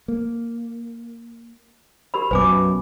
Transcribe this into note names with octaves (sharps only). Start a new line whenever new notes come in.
A#3
G4 A#4 B5
B1 F#2 B2 B4 G#5 D6